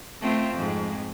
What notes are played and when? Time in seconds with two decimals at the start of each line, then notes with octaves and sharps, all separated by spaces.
0.21 A3 C4 F4
0.54 F2 G#2